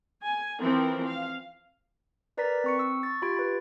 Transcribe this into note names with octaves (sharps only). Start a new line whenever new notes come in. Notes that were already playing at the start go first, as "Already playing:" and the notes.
G#5
E3 F3 C4 A#4
F5
A#4 B4 D5 A#5 A6 B6
C4 C#6 C#7
E6
C#6 A6
F4 G4 B5 G#6 A6 D7
B4 B5